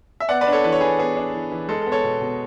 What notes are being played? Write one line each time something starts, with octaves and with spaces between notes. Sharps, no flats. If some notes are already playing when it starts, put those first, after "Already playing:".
E5
B3 D5 F#5
B4 D5
D4
A4 C#5
E3 B4
C#5
E3 G#4 B4
B3 G#4
D4
E3
E3
G#3 A4
A4
B3
A4 C#5
B2
B2